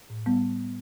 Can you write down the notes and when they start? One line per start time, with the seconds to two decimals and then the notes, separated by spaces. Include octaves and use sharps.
0.10 A2
0.26 G3 B3